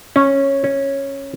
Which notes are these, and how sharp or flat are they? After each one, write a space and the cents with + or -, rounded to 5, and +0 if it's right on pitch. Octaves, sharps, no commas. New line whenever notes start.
C#4 -10
C#4 -10